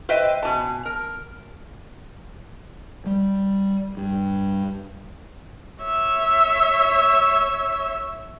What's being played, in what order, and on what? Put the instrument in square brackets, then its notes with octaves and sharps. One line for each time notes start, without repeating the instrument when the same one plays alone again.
[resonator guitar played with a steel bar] B4 C5 D#5 E5 G5
B2 G4 G#5 A5
A#4
[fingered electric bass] G3
G2
[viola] C#5 E5